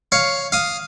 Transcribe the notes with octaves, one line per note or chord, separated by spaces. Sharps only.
C#5 F5
F5 D#6